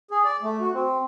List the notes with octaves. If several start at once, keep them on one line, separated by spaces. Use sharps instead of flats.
G#4
D5
A3
F#4
C4